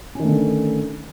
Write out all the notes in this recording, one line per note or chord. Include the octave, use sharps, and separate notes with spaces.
D3 D#3 A3 C#4